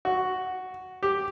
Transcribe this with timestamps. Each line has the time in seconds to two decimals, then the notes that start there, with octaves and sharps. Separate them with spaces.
0.05 F#4
1.03 G4